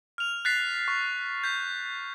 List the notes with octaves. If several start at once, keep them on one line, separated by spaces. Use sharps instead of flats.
F6 F7
F#6 A6 B6 C7
C#6
G6 B6